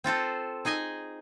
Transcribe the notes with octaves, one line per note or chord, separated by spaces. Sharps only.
C4 F4 A4 C5
D#4 G#4 D#5 G#5